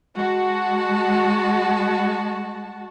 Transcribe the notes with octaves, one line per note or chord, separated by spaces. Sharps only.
G#3 F#4 A5